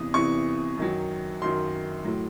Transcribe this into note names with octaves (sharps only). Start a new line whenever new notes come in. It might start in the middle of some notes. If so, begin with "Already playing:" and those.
Already playing: E2 C3 E3 D#6
E2 C3 E3 C#6
F#2 D#3 F#3
F#2 D#3 F#3 C6
A2 F#3